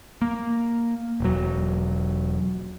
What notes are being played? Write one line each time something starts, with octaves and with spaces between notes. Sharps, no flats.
A#3
E1 F#3